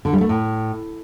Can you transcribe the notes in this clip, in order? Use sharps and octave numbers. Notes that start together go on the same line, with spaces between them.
D3
G3
A3
A2